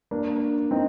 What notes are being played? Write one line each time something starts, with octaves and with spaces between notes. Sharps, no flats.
A#3 D4
C4 D#4